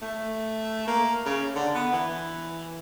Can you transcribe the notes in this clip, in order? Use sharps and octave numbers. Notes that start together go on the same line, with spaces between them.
A3
A#3
C#3
D3
B3
E3